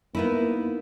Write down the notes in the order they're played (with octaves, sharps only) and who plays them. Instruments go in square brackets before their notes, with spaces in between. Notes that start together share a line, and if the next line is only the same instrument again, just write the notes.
[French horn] A#3 [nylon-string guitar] B3 D#4 E4